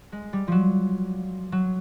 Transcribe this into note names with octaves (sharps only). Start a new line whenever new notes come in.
G#3
G3
F3 F#3
F#3